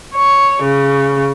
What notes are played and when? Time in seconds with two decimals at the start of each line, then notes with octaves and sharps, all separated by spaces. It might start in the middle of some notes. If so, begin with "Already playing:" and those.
0.14 C#5
0.62 C#3